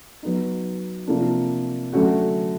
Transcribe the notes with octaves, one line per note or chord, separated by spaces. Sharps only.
F#3 B3 D#4
C3 F3 A#3 D4
D3 F#3 A3 C#4 F#4